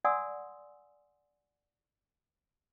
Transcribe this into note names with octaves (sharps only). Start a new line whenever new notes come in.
D5 F#5 G#5 C6 D#6 E6